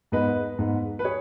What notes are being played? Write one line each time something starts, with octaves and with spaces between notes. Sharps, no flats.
G#2 G#3 B3 B4 D#5
G#2 G#3 B3
B4
G#4 C#5